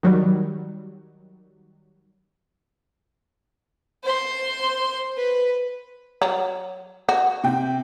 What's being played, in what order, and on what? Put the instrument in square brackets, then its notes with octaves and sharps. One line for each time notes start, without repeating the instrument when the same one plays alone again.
[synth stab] D#3 F#3 G3
[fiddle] C5 C6
B4
[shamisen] F#3
F#4
[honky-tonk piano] C3 G5